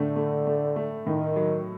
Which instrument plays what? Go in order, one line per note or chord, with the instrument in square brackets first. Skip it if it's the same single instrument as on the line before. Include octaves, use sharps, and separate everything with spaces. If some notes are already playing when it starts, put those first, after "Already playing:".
Already playing: [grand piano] A2 A3 [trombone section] D3
[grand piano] A3
A3
A3
[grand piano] A2 [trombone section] D#3
[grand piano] F#3